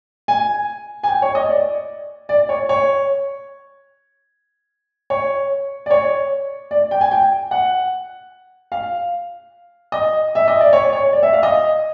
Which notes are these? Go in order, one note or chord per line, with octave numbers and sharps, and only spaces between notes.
G#5
G#5
G5
C#5
D#5
D5
D5
C#5
C#5
C#5
D5
C#5
D5
G5
G#5
G5
F#5
F5
D#5
E5
D#5
D5
C#5
C#5
D5
E5
F5
D#5